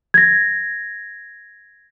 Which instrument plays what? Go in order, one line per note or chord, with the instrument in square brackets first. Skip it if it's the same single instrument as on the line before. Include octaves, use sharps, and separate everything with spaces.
[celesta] G#6 A#6